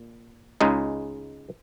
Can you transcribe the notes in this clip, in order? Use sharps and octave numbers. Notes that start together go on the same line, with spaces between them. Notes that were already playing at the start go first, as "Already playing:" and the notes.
Already playing: A#2
C#2 C#3 G#3 D#4